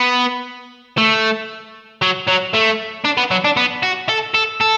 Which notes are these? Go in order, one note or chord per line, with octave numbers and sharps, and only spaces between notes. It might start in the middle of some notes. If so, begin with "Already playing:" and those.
Already playing: B3
A3
F#3
F#3
A3
D4
B3
F#3
D4
B3
F#4
A4
A4
A4